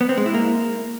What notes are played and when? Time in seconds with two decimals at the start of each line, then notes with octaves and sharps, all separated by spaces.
0.01 B3
0.09 C4
0.17 G#3
0.26 E4
0.34 A#3